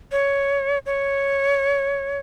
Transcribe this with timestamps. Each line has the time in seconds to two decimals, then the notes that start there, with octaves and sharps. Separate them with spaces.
0.12 C#5
0.86 C#5